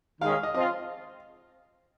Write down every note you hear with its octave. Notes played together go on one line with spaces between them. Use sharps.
D#3 G#3 C#4 F5
F5
D#5
F3 C4 F4 D#5